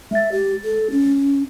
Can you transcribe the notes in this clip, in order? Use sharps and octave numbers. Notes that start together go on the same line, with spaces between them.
G#3 E5 A6
G4
A4
C#4